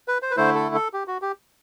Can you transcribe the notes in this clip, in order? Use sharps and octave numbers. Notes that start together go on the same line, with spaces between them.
B4
C5
B4
D3 A3 E4 C5
A4
A4
G4
F#4
G4